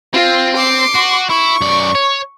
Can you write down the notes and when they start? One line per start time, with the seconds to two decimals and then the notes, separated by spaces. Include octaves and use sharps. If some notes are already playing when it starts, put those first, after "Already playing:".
0.14 C4 F4
0.57 C6 D6
0.95 F#4
1.29 E4 C#6
1.61 F#2 D5
1.95 C#5